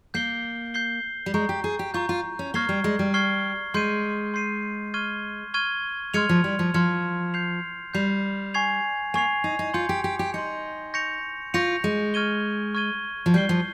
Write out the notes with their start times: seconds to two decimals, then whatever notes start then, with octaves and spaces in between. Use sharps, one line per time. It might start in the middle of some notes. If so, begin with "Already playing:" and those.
0.14 A#3 G6 C7 G7
0.74 G6 C7 G7
1.26 G3
1.34 G#3 A#5 C#6 G6
1.49 G4
1.64 G#4
1.79 G4
1.94 F4 A#5 C#6 G6
2.09 F4
2.39 C#4
2.54 A#3 C#6 F6 G#6 C7 G7
2.69 G3
2.84 G#3
2.99 G3
3.14 C#6 F6 G#6 C7 G7
3.74 G#3 C6 G6 C7 D#7
4.34 C6 G6 C7 D#7
4.94 C#6 F6 G#6 D#7 G7
5.54 C#6 F6 G#6 D#7 G7
6.14 G#3 C6 F6 G#6 C#7 F7
6.29 F3
6.44 G3
6.59 F3
6.74 F3 C6 F6 G#6 C#7 F7
7.34 G6 C7 F7
7.94 G3 G6 C7 F7
8.54 G#5 C#6 G#6 C7 F7
9.14 A#3 G#5 C#6 G#6 C7 F7
9.44 D#4
9.59 D#4
9.74 F4 C6 G6 C#7
9.89 G4
10.04 G4
10.19 G4
10.34 D#4 C6 G6 C#7
10.94 C#6 G6 A#6 C#7 F7
11.54 F4 C#6 G6 A#6 C#7 F7
11.84 G#3
12.14 C#6 F6 G#6 D#7 G7
12.75 C#6 F6 G#6 D#7 G7
13.26 F3
13.34 G3 G6 C7 G7
13.49 F3